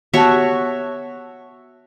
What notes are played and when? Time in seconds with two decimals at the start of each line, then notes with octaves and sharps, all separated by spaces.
0.14 B3 F#4 G4 C#5 E5 A5